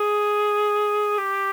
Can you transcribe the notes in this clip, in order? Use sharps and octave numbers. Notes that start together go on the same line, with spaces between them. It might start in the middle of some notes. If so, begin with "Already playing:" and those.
Already playing: G#4
G4